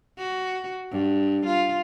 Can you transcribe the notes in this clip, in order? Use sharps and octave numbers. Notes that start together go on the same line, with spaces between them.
F#4
G2
F4